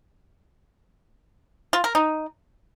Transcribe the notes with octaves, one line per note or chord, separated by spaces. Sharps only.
F4
A#4
D#4